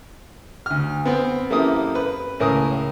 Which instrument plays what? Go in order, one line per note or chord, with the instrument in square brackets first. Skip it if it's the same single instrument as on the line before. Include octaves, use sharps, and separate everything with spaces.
[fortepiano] D2 F6
B3 C4
F#2 A#3 E4 G4 A4 D#6
B4
C#2 A2 A#4 G#5 D#6